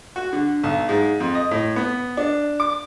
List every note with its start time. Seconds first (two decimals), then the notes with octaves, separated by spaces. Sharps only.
0.16 F#4
0.33 D3
0.63 B1
0.89 G#2
1.20 F2
1.35 D#5
1.51 A2
1.76 B3
2.17 D4
2.60 D6